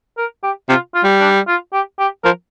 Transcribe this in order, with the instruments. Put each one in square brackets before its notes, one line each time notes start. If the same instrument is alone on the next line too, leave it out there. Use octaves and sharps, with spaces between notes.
[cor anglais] A#4
G4
[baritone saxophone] C3 [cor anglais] F4
[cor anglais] F4
[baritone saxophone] G3
[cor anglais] D4
F4
G4
G4
[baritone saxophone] F3 [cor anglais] A#4